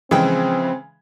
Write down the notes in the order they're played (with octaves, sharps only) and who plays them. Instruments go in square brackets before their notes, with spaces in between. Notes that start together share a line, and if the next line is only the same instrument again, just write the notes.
[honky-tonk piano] C#3 E3 G#3 [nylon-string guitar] F3 G#4 G5 [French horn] C4